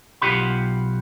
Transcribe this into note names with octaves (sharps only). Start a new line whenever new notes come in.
B1 F3 F4 G4 F#5 B5